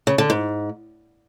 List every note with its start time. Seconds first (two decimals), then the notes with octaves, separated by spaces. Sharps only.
0.07 C#3
0.18 D3
0.30 G#2